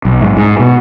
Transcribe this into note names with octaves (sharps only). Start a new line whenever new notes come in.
B1
G#2
G#2
B2